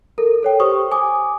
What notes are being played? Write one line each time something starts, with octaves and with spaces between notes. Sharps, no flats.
A4 A#4
A4 C#5 G5
G4 C5 C#6 D#6
G#5 D6 D#6